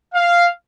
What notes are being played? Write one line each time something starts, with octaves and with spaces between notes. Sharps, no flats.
F5